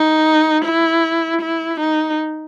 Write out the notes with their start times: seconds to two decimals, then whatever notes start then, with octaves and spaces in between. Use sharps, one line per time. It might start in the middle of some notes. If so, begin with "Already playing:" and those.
Already playing: D#4
0.65 E4
1.42 E4
1.80 D#4